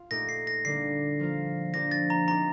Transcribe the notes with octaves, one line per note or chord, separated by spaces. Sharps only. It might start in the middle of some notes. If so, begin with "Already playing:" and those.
Already playing: F4
A#2 A3 D#4 G4 A#6
C7
A#6
D3 G3 A#3 D4 C7
F3 A#3 F4
F3 A#3 D4 G4 A#6
A6
A#5
F3 C4 D#4 G4 A#5